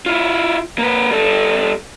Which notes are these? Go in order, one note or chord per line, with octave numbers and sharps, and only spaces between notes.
E4 F4
A#3 B4
G3 A4